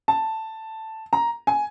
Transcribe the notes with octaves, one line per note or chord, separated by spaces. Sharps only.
A5
A#5
G#5